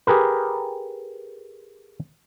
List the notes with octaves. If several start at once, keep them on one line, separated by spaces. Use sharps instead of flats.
G4 G#4 A#4 B4